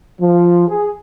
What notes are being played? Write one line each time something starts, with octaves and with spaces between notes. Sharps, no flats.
F3
G#4